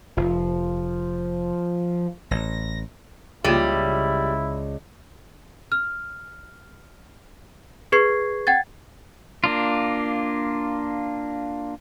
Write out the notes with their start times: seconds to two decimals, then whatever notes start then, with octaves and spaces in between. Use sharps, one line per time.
0.17 F1 F3
2.31 A1 A#6
3.44 C#2 G3 A#3 E4 F4 G#4
5.72 F6
7.92 G#4 B4 C#6 G#6 C7
8.47 F#5 G5 G#6 A6
9.44 A#3 D4 F4